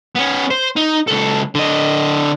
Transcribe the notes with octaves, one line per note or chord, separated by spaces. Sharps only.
B3 C#4
C5
D#4
C#2 A4
D3 D#5